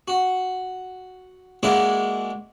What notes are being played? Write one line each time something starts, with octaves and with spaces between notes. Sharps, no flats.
F#4
G#3 A#3 D4 E4 F#4 G#4